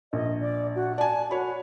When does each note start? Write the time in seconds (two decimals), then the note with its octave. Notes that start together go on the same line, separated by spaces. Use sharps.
0.13 A#1 D#5
0.41 D5
0.75 F#4
0.98 D5 G#5 A5
1.31 F#4 C#5 B5